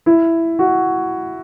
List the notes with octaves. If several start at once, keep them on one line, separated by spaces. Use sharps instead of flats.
E4
F#4